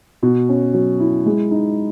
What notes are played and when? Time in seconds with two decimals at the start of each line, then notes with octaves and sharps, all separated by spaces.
0.22 B2
0.49 C#4
0.74 F#3
1.00 E4
1.26 G#3
1.51 D#4